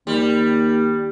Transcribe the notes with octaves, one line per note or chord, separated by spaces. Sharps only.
D#2 G3